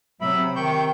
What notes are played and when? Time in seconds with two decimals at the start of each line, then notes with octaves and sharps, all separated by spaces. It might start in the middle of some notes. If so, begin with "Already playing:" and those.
0.21 C3 F#3 E5 B5
0.56 D#3 G5 C#6 G6